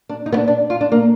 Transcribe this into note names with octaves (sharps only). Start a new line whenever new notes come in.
D4
D#4
B3
D4
D4
F4
D4
A#3